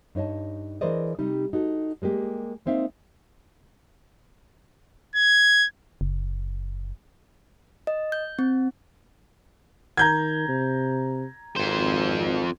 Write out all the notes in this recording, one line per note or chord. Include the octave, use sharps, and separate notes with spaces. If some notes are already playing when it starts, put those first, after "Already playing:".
G2 D#4 C#5 D#5 A5
E3 G#4 A#4 C5 D5 D#5
C3 G3 D#4
D#4 F#4 A4
G3 G#3 A#3 G4
G#3 A#3 C4 D#4 E5 F5
G#6
F#1
D#5
G6
C4
D#3 A#5 G6 G#6
C3
G#1 F2 C5